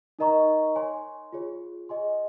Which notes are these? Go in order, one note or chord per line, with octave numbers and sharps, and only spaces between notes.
D#4 A#4 D#5 A#5 C#6
C#5 G#5 C6
F4 G#4 C#5
G#4 D#5 G#5 C6